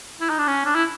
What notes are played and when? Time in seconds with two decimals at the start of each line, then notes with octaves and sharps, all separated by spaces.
0.21 E4
0.29 D#4
0.39 D4
0.47 C#4
0.66 D4
0.75 E4